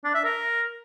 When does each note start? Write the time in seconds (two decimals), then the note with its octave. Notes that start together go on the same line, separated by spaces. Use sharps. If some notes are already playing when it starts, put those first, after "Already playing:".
0.04 D4
0.14 E5
0.25 A#4